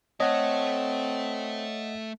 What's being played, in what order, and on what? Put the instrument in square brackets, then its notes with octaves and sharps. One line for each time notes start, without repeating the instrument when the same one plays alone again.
[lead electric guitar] A3 A4 [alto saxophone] C4 [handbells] C#5 [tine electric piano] D#5 F#5